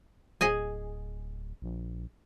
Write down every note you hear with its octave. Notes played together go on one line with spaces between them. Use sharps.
D1 G#4 D#5 G#5
A#1